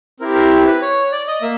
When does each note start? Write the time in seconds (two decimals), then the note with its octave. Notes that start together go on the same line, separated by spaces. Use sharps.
0.20 C4 E4 G4 A#4
0.35 A#4
0.66 B4
0.82 C#5
1.12 D5
1.28 D#5
1.42 A#3 E5